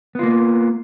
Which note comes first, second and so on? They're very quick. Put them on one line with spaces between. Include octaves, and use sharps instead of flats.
B3 F4 A#3